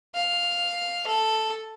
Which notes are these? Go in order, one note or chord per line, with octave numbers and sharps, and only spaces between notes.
F5
A4